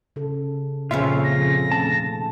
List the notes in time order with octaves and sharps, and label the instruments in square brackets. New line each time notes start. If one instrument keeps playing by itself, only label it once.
[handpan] C#3 A4
[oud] F2 C#4 E5 [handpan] A#2 G#4 [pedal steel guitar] C#3 F4
[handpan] F3 [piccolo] A#6
[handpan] C3 D#3 A3 [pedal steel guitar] A5